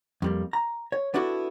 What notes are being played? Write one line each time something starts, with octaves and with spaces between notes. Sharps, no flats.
F2 G3 A#3
A#5
C#5
B3 D4 E4 F#4 G#4 A4